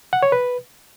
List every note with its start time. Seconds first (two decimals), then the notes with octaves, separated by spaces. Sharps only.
0.13 F#5
0.23 C#5
0.32 B4